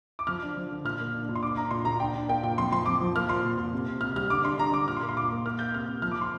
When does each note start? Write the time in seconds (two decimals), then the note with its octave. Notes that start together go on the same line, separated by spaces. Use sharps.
0.19 D6
0.27 F3 F6
0.43 D4
0.57 F3
0.71 D3
0.85 A#2 F6
1.00 A#3
1.14 D4
1.29 A#2
1.35 C6
1.42 D4 D6
1.57 D4 A#5
1.71 A#2 C6
1.85 A#2 A#5
2.00 D4 G5
2.15 D4
2.28 A#3 G5
2.43 A#2 G5
2.58 F2 C6
2.71 F3 C6
2.86 F2 D6
3.01 F3
3.15 A#3 F6
3.29 A#2 C6
3.44 A#2
3.58 A#2
3.73 C3
3.87 C3
4.01 C3 F6
4.16 G3 F6
4.30 D3 D6
4.44 D4 C6
4.58 D4 A#5
4.73 D3 D6
4.87 A#2 F6
4.97 C6
5.02 A#3
5.09 C6
5.16 A#2 D6
5.31 A#3
5.45 A#3 F6
5.59 A#3 G6
5.74 C3 F6
5.88 C3
6.02 F3 F6
6.12 D6
6.21 C6